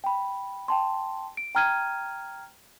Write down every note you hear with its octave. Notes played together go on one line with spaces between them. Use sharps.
G5 B5
G5 A5 C6
D7
G5 A#5 F6 G#6 D#7